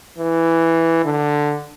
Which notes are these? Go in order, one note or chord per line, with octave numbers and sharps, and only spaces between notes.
E3
D3